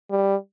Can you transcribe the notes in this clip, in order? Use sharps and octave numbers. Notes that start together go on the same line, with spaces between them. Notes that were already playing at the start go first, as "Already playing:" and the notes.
G3